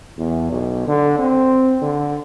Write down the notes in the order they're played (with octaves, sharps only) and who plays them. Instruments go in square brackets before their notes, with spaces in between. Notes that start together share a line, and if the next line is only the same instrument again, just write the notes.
[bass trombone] E2
B1
D3
C4
D3